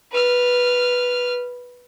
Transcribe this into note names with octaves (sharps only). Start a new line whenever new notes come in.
B4 F6